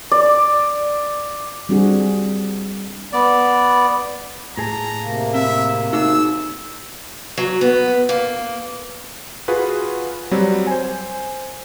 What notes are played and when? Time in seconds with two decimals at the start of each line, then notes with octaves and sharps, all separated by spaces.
0.12 D5
1.69 G3 C4 D4 F#4 G#4
3.13 B3 D5
4.57 A2 G#4 A5 A#5
5.01 C3 A#3
5.34 C4 E5
5.93 D#4 F#4 G#4 E6
7.38 F#3
7.61 B3
8.09 A#3
9.48 F4 F#4 G#4 B4
10.31 F#3 G3 C4
10.67 C5 G#5